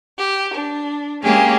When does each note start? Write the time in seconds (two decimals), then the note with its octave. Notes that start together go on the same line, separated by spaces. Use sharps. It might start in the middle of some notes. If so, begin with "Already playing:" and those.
0.18 G4
0.54 D4
1.22 G#3 A#3 C#4 G4 G#4